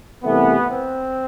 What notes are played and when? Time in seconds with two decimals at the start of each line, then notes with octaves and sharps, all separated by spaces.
0.24 C2 C3 E3 A3 B3
0.69 C4